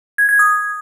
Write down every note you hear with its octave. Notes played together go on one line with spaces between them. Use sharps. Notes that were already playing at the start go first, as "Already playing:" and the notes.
G#6
G#6
D#6